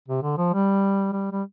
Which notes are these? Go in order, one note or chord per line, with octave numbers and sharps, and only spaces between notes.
C3
D3
F3
G3
G3
G3